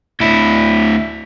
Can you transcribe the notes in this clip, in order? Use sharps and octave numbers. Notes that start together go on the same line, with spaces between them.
D2 E4